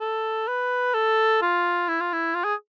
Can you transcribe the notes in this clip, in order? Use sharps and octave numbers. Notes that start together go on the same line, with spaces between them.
A4
B4
A4
F4
E4
F4
E4
F4
G#4